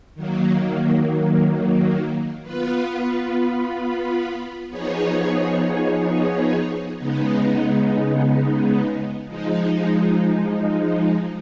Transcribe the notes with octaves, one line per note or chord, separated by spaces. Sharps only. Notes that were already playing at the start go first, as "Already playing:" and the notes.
D#3 F#3 A#3
B3 F4 B4
F3 B3 D#4 G#4 C#5
C#3 G#3 B3 D#4
F3 G#3 D#4